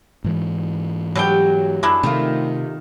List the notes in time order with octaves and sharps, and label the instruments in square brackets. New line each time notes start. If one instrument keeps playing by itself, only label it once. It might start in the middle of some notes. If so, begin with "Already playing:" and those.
[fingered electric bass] G#2 E3 G#3
[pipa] B2 D4 G5 [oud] F#3 G4
[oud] F#2 [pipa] G#3 D4 E4
[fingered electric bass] C3 [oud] D#3 A3 F4